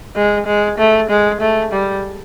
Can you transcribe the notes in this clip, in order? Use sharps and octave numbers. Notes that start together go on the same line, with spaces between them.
G#3
G#3
A3
G#3
A3
G3